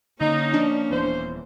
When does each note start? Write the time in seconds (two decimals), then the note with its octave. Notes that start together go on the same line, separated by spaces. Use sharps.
0.21 D3 A#3 C#4 D#4
0.53 F3 D4
0.91 D#1 E3 B3 C5